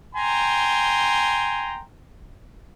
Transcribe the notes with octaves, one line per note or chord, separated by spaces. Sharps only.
G5 G#5 A#5 C6